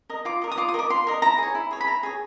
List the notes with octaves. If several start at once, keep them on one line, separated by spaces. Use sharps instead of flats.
A#4 D#5
F4 D6
A#4 D#5
D#6
F4 D6
D#6
A#4 D#5 D6
F4 C6
A#4 D#5
E4 A#5
G#4 C#5
E4
G#4 C#5
B5
E4 A#5
G#4 C#5